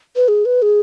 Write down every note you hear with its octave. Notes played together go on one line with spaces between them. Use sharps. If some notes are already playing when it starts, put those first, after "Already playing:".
B4
G#4
B4
G#4